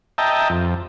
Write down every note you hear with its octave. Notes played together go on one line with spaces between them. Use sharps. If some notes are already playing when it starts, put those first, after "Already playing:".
D#5 E5 G5 A5 A#5
F2